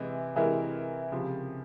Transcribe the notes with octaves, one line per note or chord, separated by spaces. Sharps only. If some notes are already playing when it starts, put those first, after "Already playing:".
Already playing: C3 E3 G#3 E4
C3 E3 G#3 E4 A#4
C#2 C3 F3